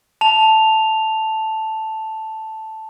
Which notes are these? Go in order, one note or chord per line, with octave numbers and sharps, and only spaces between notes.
A5 F7